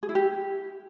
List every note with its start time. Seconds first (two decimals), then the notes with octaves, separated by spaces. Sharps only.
0.03 G#4
0.09 E4
0.15 G4